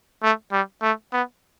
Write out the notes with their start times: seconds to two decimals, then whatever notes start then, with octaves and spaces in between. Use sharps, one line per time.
0.23 A3
0.52 G3
0.82 A3
1.13 B3